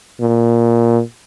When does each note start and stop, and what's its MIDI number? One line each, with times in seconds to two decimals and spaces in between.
0.21 1.01 46